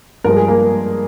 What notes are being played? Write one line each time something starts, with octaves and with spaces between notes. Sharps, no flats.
G2 F3 G#3 A#4
G#4
A#3 A#4